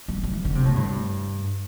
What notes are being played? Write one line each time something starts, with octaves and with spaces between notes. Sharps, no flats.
G3
G3
E3
D3
C3
A2
G2